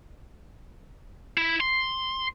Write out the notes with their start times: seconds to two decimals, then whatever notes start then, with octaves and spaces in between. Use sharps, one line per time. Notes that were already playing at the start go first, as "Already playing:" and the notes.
1.37 E4
1.61 C6